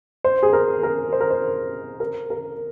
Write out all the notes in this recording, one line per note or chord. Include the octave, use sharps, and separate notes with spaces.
C5
G#4
A#4
A#4
C5
A#4
C5
A#4
A#4